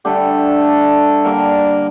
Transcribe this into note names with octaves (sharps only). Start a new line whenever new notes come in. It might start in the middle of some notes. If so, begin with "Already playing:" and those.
D3 G3 A3 D4 G4 A4
D3 G3 A#3 D4 A#4